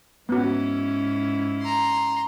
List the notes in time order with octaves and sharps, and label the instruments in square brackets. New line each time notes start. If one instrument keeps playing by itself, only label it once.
[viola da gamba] G#2 C#4 E4 [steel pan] B3 F#4
[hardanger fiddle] A#5 C6